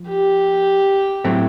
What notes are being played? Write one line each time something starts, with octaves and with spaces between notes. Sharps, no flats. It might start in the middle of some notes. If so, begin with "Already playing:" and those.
Already playing: F3
G4
A2 F#3 A3 C4